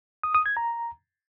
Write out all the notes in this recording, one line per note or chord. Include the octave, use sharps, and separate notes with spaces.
D#6
D#6
G#6
A#5